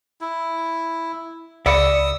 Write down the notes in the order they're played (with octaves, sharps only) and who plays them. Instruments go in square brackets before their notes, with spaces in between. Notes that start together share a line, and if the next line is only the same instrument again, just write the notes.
[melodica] E4
[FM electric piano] C#2 B5 C#7 [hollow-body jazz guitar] D5 E5 [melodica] D#6 E6